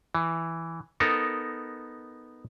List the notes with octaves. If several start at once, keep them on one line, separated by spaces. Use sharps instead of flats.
E3
B3 D#4 A4 A#4